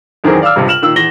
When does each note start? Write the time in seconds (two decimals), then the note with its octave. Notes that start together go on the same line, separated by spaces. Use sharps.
0.24 F#2 D#3 E3 C4 G#4 A#4
0.42 D5 F5 D6 E6 F6
0.56 C#2 G2 C3 G3
0.68 F6 E7 F#7
0.82 A#2 D#3 E6
0.96 E2 A#6 G7